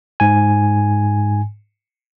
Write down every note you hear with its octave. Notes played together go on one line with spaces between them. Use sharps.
G#2 G#5